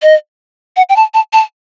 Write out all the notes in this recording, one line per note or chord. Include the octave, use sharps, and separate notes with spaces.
D#5
F#5
G5
A5
A5
A5